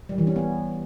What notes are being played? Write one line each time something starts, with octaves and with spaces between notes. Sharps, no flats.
G3
E3
C#4
B3